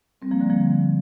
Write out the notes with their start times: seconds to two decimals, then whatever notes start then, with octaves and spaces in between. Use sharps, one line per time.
0.22 G3 C4
0.31 F3 A#3
0.40 D3 G3
0.50 F3 A#3